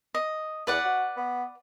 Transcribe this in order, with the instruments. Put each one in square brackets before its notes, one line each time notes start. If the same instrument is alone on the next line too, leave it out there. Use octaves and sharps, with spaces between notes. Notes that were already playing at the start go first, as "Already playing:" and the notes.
[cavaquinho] D#5
[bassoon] E2 [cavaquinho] B4 D5 F#5
[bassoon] F#4
B3